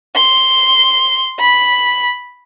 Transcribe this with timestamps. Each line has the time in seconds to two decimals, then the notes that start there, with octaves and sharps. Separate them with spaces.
0.16 C6
1.40 B5